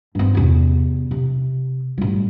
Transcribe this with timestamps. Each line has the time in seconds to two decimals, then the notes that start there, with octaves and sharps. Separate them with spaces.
0.15 G2 C4
0.35 E2 C3
1.11 C3
1.98 A2 G3